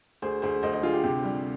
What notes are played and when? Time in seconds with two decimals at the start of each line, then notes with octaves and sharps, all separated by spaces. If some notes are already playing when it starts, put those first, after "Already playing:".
0.22 D2 G#4 C5
0.42 D2 G#4 C5
0.63 D2 C5 D#5
0.73 C5 D#5
0.83 D3 F4 G#4
0.93 G4
1.04 C3 G4
1.24 G3